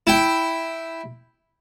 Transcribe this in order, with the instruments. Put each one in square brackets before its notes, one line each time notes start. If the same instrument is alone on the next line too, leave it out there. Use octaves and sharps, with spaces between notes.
[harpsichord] E4 G5